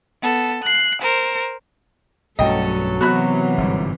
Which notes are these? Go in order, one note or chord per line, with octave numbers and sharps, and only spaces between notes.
B3 A4
F#6 C7
A#4 C5
B1 G2 F#3 A3 C#4 A4 D#5 G5
C3 E3 B3 F#4 B5 F#6
G1 G#2 G3